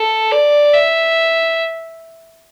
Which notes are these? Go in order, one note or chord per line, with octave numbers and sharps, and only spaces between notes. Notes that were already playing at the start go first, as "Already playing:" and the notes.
Already playing: A4
D5
E5